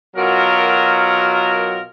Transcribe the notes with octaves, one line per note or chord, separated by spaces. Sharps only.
B2 F#3 F4 A#4